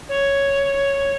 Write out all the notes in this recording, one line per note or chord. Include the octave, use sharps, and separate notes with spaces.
C#5